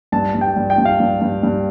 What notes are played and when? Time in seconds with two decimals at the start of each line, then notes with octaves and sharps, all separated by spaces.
0.12 G2 A5
0.35 G2
0.41 G5
0.56 G2
0.70 G5
0.78 G2
0.85 F5
1.00 G2
1.21 G2
1.43 G2